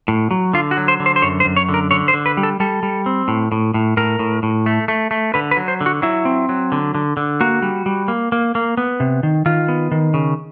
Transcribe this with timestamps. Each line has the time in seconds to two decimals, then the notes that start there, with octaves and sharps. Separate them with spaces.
0.08 A2
0.31 F#3
0.53 D3 F4
0.71 F#4
0.77 F#3
0.88 C5
1.00 D3
1.06 C5
1.16 C5
1.22 F#2 C#5
1.40 C5
1.45 F#2
1.56 C#5
1.69 D3
1.74 A#4
1.91 D3 C#5
2.08 C5
2.14 D3
2.26 B4
2.37 G3
2.43 A4
2.60 G3 A4
2.83 G3
3.06 C4
3.28 A2
3.52 A2
3.74 A2
3.97 A2 A#4
4.19 A2
4.43 A2
4.66 A3
4.88 A3
5.11 A3
5.34 D3 B4
5.51 B4
5.57 F#3
5.68 C5
5.81 D3
5.86 F#4
6.02 F#3 E4
6.25 C4
6.49 F#3
6.72 D3
6.95 D3
7.17 D3
7.41 A#3 F#4
7.62 G3
7.86 G3
8.08 A#3
8.32 A#3
8.55 A#3
8.77 B3
9.00 C3
9.23 D#3
9.46 D#3 F4
9.68 B3
9.91 D#3
10.14 C#3